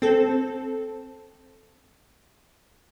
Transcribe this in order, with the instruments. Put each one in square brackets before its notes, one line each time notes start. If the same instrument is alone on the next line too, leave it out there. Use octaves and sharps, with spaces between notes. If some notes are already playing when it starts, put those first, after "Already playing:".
[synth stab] C4 A4